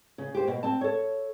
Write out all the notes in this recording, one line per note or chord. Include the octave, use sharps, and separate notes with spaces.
C#3
G4 C5
B2
C4 A5
A4 C#5